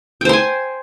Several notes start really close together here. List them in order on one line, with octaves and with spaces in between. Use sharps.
G5 C5 C6 G#5